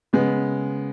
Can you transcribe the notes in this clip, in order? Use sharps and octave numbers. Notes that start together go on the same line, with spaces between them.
C#3 G#3 B3